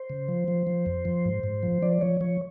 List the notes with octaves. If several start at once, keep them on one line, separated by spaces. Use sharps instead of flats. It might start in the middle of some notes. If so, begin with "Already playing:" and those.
Already playing: C5
C#3
F3
F3
F3
F2
F3
G#2
G#2
F3
F3 D5
F3 C#5
F3 C#5